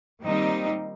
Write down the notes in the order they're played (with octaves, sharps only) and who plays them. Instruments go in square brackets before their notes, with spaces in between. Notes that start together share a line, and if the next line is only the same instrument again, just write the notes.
[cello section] A#2 D#3 G3 C4 D#4